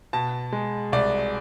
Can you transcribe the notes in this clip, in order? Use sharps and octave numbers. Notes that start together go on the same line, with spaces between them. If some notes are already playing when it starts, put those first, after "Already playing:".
B2 A5
G#3
C2 D5